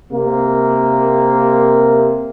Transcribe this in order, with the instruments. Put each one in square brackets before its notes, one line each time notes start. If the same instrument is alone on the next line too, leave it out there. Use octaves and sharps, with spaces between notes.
[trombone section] C3 A#3